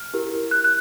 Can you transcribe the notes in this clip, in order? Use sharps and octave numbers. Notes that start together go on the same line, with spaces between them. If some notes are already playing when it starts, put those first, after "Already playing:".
Already playing: F6
E4 G4 A#4
F#6
F#6